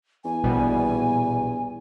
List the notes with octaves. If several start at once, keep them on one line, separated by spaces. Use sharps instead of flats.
E2 G#5
A#1 B2 G3